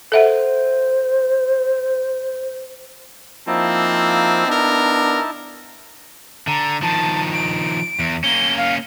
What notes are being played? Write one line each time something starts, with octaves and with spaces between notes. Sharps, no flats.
A4 C5 E5 F#5
F3 A#3 C4 D#4 E4 A5
B3 D4 A#4
D3 A#5
D#3 F3 A5
D7
E2
A#3 C#4 G7
F5